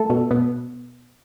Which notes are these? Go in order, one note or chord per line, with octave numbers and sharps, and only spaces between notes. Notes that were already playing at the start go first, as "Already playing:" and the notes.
Already playing: A3 A4
B2
B2